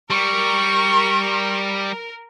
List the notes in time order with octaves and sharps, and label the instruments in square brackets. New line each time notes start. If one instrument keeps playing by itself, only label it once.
[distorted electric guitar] G3 [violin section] A#4 [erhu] C#6